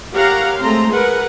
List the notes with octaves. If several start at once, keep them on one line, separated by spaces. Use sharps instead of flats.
G4 A#4 C#5 F5 F#5 A#5
G#3 A3 C4 A#5 C6
G#4 A#4 B4 F#5